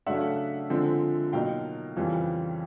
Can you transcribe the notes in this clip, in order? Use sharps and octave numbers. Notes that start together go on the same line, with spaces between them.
C#3 F#3 A3 D4 E5 F#5
D3 F3 G#3 C4
B2 F#3 A#3 D#4 F5 G5
F2 C#3 E3 G3 C4